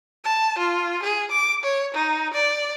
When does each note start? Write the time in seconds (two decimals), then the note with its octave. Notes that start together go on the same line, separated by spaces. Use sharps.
0.24 A5
0.58 F4
1.03 G#4
1.31 D6
1.64 C#5
1.95 D#4
2.34 D5